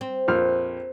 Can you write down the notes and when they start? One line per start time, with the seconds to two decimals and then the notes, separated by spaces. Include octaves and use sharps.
0.01 C4
0.28 A#1 F2 F6